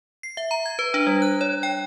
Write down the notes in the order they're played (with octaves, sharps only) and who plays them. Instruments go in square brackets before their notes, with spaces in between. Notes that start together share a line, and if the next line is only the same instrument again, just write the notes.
[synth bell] C7
E5
A#5
G#6
B4
D4
G3
F#6
C#5
G5